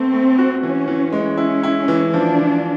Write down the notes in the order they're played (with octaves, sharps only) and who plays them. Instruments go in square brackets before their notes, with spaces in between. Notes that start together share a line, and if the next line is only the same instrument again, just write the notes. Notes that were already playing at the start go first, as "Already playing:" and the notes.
Already playing: [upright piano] A3 B3 [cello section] C4
[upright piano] A3
F#4
[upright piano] E3 [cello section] C#4
[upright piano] E3
G#3
[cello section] C#4 [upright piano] E4
[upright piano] E4
E3
[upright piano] F3 [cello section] D4
[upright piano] F3